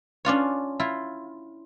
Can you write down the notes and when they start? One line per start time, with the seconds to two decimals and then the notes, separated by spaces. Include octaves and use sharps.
0.25 C#4 D4 F4 C#5
0.80 E4 F4